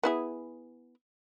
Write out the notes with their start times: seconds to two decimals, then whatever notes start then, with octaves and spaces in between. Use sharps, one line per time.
0.03 B3 E4 G#4